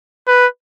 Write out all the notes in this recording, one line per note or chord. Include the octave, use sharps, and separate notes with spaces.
B4